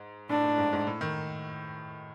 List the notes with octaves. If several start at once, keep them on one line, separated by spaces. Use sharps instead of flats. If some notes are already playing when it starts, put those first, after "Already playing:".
Already playing: G#2
A2 D4
A2
G#2
G#2
A2
D#3